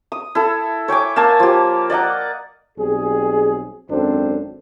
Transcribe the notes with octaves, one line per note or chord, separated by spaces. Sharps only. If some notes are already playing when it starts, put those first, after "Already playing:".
D#6
E4 A4
C#5 G5 G#5 D6
A#3 G#5 A5 E6
F3 G4
D5 D#5 F#5 A#5
B1 G3 C4 G#4
G#1 F#2 C4 D4 A4 C5